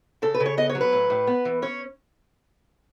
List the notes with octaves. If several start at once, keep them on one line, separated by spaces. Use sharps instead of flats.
C#3 A4
B4
C#3
C#5
B3 D#5
C#5
F#3
B4
A2
A2
B3
E3
C#4 C#5